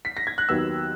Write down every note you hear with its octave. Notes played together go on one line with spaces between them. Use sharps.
B6
A#6
G#6
F#6
D#2 D#3 F#3 B3 E6